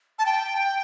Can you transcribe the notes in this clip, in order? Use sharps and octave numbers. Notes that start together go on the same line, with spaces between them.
A5
G5